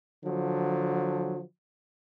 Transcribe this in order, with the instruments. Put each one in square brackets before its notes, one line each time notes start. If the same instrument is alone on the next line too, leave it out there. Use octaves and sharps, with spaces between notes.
[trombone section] D3 F3 F#3